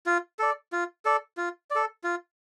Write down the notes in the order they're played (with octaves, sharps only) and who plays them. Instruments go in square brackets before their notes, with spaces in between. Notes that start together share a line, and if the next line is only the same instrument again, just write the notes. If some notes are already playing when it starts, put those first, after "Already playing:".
[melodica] F4
A4 D5
F4
A4 D5
F4
A4 D5
F4